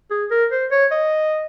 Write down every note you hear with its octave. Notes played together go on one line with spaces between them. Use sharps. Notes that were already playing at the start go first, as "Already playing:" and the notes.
G#4
A#4
C5
C#5
D#5